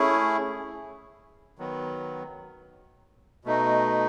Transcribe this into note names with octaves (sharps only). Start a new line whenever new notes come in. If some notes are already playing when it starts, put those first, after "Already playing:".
Already playing: A3 C#4 E4 G#4
D#3 F#3 B3
B2 A3 D#4